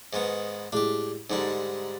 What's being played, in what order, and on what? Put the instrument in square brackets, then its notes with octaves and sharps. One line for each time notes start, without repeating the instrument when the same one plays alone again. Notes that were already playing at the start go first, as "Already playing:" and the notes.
[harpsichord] G#2 D#3 B3
[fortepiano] A2 G#3 [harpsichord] D4 G4
[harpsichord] G#2 D3 G3 [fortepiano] D#4